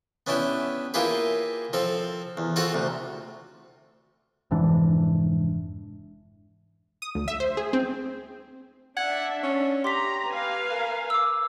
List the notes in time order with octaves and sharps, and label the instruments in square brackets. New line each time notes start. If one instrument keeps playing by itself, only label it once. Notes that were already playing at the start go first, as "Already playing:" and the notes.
[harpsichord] B3 C#4 D4 E4 G4
A#3 E4 F4 G4 G#4 B4
F3 C4 A4
E2
C4 F4 F#4 A4 F5 F#5
D2 C3
[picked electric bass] F1 G#2 E3 D4
[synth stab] D#6
D2
E5
C5
G#4
C4
[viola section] D4 E5 [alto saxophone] F#5 [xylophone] G#6
[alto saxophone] C#4
[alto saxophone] G4 [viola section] A#5 [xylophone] C6 D6 B6
[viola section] B4 F5 G#5
[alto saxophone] A#4
[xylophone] D6 E6